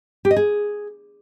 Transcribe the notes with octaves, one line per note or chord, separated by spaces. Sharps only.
G4
D#5
G#4